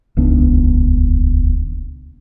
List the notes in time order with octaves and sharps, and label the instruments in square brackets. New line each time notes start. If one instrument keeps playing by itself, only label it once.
[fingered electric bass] D#1 C#2 B3 D4